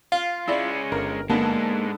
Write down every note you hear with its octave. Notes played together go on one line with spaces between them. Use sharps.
F4 F5
G#3 C#4 E4 D5
G1 A#4
G#2 D3 G#3 A#3 B3 A5